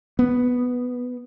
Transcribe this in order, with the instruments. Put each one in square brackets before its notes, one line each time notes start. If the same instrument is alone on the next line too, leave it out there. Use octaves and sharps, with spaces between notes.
[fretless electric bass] B3